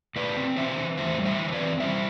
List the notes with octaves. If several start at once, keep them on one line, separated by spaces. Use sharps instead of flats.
A2 B4 D5
C4
E3 C5 E5
E3
A2 C5 E5
G3
C5 E5
E3
C5
B4 D5
C4
G3 C5 E5